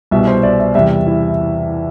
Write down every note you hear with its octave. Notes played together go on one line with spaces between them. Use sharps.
C2 B2 G3 E5
C5
D5
E5
E2 C3 G3 E5
E4